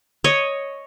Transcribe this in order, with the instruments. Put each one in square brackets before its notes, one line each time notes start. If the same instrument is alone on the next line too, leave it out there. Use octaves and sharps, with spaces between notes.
[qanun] C#5 D#5